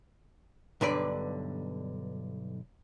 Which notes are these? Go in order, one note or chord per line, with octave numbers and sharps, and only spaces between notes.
B1 G2 D3 B4 D5